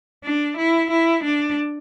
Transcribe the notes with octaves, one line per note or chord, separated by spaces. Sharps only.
D4
E4
E4
D4